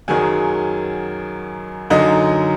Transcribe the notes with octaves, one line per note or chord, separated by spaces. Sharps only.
F#2 D#3 F#3 G#4 G#5
F#2 D3 F#3 D#4 D#5